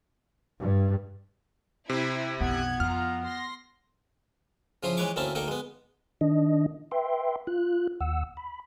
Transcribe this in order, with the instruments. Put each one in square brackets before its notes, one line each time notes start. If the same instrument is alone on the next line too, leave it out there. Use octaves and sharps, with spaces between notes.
[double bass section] G2
[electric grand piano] C3 [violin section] E4 G#6 [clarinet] C5
[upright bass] B1 F2 [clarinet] B3 [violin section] F#6 G#6
[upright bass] F2 [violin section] F4 A#5 [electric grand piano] F6
[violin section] C6 A#6
[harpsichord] C#3 F3 E4 C5 D#6
E3 G#3 B4 C#5 C#6 D6
D2 A#3 C4 C#4 E4 A5
D2 A#3 D#4 A4 G5
G#3 B3
[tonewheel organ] D#3 D4 D#5
B4 E5 G5 C6
F4 F#6
D#2 F#5 E6
B5